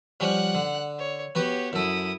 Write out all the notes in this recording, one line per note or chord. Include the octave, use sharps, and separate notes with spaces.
F3 G3 C#4 F#5 F#6
D3
C#5
B3 F#4 G4 B4 C#5
F#2 E4 A4 D#6